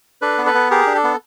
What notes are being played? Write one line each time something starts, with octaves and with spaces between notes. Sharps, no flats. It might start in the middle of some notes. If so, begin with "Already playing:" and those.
D4 A4 B4
B3
A4 B4
B3
G4 G#4 A#4
D4
A4
B3